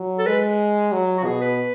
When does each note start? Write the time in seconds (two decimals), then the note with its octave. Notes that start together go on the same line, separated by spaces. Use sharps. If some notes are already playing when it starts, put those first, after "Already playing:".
Already playing: F#3
0.19 A4
0.26 G#3 B4
0.92 F#3
1.17 F#4
1.25 B2 G#4
1.41 B4